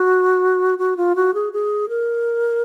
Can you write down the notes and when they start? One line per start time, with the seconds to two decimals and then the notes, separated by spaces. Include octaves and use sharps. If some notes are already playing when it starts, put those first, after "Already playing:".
Already playing: F#4
0.79 F#4
0.97 F4
1.16 F#4
1.34 G#4
1.53 G#4
1.89 A#4